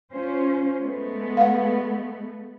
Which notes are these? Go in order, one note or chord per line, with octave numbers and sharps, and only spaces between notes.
C#4 F4 C5
G#3 A3 B3
F5 F#5